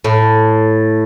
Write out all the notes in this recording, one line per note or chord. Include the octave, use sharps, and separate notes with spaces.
A2